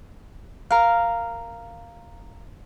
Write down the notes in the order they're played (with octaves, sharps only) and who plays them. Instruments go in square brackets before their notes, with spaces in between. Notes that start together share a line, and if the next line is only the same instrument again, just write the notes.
[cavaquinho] A#4 F5